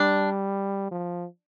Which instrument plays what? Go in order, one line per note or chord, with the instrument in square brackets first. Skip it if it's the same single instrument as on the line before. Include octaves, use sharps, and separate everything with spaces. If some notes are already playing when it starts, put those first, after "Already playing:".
Already playing: [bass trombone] G3 [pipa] D4
[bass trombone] F3